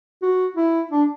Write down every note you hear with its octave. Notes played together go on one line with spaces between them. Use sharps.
F#4
E4
D4